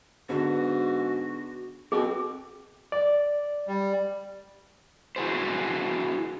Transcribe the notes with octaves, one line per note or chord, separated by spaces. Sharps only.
G#2 D3 B3 F#4
B2 C4 G#4
D5
G3
E4 F#4 G#4 C5